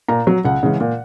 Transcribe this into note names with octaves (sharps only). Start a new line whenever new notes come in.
A#2 A#5
F#3
C#2 F#5
C#3 E3 G#3
A#2